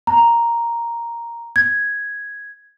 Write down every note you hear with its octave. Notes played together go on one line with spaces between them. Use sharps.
A#5
G#6